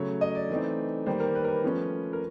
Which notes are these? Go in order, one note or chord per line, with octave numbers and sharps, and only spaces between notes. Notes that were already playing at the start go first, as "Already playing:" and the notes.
Already playing: C#3 F#3 A3 C#5
D#5
D5
E3 A3 C4 D#4
D#3 G3 A#3 C5
A#4
B4
A#4
B4
F3 A3 C#4
A#4